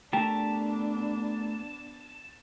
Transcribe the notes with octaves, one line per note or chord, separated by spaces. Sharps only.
A3 B3 D4 F4 G4 A#4 G5 A5